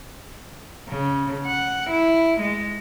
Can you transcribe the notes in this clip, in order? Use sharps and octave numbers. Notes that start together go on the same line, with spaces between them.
C#3
F#5
E4
G#3